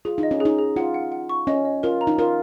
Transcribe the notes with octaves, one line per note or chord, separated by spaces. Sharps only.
F4 G#4
D#4
D#5
C#4
G#4
D#4
G#4
F4 F#5
F#5
F#5
C#6
C#4 D#5
D#5
F4 A#4
A#5
D#4
F4 A#4